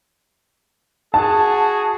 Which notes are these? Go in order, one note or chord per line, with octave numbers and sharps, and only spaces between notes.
F#4 G#4 A5